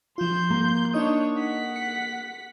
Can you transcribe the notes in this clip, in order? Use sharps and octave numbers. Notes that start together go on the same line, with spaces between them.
F3 F4 C6 G6
A#3
D4 D#4 C#5 D#5 D#6
F#5 B6
C#7